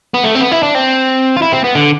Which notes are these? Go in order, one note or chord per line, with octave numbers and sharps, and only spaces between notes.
B3
A3
C4
B3
E4
D4
C4
F4
E4
C4
B3
D3